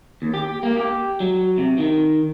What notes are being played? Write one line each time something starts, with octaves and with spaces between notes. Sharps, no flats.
D#2
G4
A#3
G4
F#3
C3
D#3